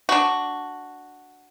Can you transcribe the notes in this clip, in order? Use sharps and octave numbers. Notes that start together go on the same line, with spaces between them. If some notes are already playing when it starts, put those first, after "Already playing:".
D4 F#4